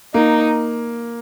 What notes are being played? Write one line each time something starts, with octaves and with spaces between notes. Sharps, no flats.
A#3 D#4